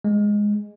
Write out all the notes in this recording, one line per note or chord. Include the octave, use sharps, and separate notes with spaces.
G#3